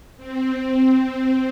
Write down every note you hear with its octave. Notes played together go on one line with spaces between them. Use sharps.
C4